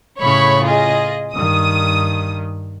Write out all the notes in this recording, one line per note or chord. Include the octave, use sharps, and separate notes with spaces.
A2 C#3 C#5 B5 C#6
F4 G#4 D#5
G2 D#3 D#6